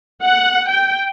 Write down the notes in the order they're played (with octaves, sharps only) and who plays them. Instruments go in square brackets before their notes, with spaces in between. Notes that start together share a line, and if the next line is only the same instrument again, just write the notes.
[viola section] F#5
G5